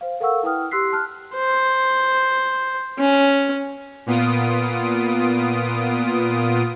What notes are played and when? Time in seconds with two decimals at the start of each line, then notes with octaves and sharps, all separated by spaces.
0.01 C5 F5
0.20 A4 A#4 F5 F#5 C#6 E6
0.43 E4 B4 G5 D#6 F6
0.71 G4 C6 E6 F#6 B6 C7
0.93 A5 F6 F#6
1.35 C5
2.99 C#4
4.06 A#2 B3 F4 D#6 D7